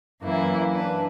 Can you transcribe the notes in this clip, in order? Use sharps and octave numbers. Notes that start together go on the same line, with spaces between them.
F#2 E3 A#3 E4
D4 B4